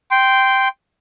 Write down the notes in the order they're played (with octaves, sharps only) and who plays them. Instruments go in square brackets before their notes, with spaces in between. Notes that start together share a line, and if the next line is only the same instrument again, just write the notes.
[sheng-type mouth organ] G5 C6